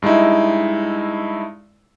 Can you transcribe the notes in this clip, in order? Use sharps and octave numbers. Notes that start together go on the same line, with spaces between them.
G2 G#3 D#4 E4